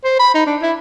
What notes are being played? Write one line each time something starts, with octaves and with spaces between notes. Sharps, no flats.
C5
B5
D#4
D4
E4